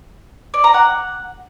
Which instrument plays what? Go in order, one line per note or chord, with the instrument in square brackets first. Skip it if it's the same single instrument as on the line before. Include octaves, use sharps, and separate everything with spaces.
[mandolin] D5
A#5
F#5